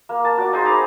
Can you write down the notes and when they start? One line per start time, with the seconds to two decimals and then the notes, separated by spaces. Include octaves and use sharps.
0.09 A#3
0.25 A5
0.38 F#4 D5
0.53 D#4 G#4 C5
0.65 A#5 B5 D6